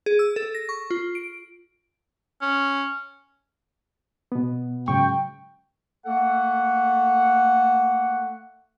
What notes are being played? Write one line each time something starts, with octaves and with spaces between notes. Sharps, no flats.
G#4
E6
A4
A#6
C#6
F4
D7
C#4
B2 B3
G#2 C#3 F#3 G5 C#6
A3 A#3 A4 F#5